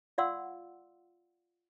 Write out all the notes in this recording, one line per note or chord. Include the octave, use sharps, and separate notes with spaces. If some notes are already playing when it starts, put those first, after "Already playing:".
F4 D5 F5 F#5 C6 E6